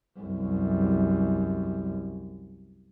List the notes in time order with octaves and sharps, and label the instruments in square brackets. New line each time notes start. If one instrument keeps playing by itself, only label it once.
[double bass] C2 F#2